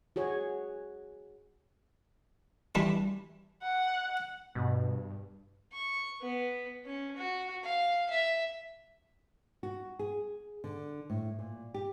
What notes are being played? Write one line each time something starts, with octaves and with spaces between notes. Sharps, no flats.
F#4 G#4 C#5
E3 G3 D4
F#5
G2 B2
C#6
B3
C#4
F#4
F5
E5
F#4
G#4
D3
A2
A#2
G4